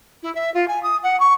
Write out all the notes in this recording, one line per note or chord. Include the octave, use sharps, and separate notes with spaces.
E4
E5
F4
G#5
D#6
F#5
C#6